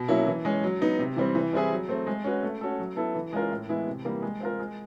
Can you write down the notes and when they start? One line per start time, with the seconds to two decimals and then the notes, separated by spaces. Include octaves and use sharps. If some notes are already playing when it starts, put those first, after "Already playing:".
Already playing: B2
0.08 F#3 A#3 C#4 E4
0.27 E3
0.45 G#3 C#4
0.63 F#3
0.81 B3 D#4
0.99 C3
1.16 E3 G3 C4
1.35 E3
1.53 G3 C4 E4 G#4
1.71 F#3
1.89 A3 C4
2.07 G#3
2.24 C#4 F#4 B4
2.43 A3
2.61 C#4 F#4 A4
2.79 F#3
2.96 B3 E4 A4
3.15 E3
3.33 G#3 C#4 F4 A#4
3.51 A2
3.69 E3 G#3 B3 E4
3.87 C3
4.05 E3 G3 A#3
4.22 G#3
4.40 C4 F4 A#4
4.59 G#3